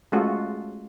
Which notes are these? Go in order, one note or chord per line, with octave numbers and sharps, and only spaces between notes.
G#3 A3 C#4 F4 F#4 A4